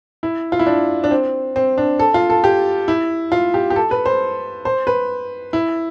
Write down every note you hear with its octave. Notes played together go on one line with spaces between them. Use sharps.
E4
F4
E4
D4
D4
C4
C4
D4
A4
F4
A4
G4
E4
F4
G4
G4
A4
B4
C5
C5
B4
E4